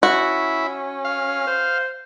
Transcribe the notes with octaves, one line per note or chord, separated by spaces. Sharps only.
C#4 E4 F#4
F5
C5